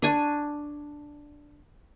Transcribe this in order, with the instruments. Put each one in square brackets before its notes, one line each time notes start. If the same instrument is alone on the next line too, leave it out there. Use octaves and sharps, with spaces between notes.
[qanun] D4 G#5 C#6